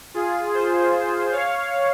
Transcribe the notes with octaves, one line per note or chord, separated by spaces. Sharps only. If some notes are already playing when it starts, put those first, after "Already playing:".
F4 G#4
G#4 C5
C#5 F5